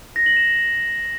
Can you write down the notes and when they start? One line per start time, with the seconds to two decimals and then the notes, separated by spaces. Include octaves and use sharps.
0.16 A#6
0.26 F#7
0.37 E7